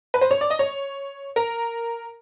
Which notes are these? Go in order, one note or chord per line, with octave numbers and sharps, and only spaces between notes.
B4
C5
C#5
D5
D#5
C#5
A#4